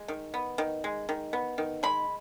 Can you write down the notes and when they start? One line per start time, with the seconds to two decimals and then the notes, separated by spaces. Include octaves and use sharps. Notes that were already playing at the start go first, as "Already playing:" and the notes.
Already playing: G#3
0.08 D#3
0.34 B3
0.58 D#3
0.84 G#3
1.09 D#3
1.33 B3
1.58 D#3
1.83 G#3 B5